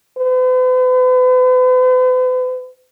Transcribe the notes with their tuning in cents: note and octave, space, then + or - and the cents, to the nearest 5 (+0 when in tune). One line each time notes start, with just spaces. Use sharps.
B4 +45